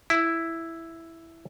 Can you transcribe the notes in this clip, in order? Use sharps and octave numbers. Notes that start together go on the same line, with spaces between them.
E4